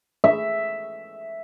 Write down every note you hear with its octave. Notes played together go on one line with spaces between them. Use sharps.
E5